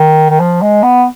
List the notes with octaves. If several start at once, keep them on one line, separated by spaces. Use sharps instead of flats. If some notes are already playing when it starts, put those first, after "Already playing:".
Already playing: D#3
D#3
F3
G#3
B3